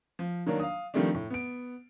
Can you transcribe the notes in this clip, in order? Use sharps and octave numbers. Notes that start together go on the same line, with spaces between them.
F3
D#3 F#3 A#3 D4
F5 D#6
D#3 F3 G3 A3 C4 D4
A2
B3 D7